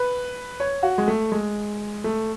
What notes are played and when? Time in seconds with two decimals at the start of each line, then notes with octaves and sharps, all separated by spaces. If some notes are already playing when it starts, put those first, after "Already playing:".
Already playing: B4
0.60 C#5
0.83 F#4
0.98 G#3
1.08 A3
1.32 G#3
2.04 A3